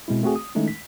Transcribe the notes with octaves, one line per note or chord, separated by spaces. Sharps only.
B2 G#3 C4 E4
A3 C4 F#4 G#4
D#6
D#3 G#3 A3 C#4 D#4 E4
B6